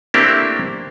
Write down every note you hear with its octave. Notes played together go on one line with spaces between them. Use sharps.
A3 A#3 C4 D4 E4 G4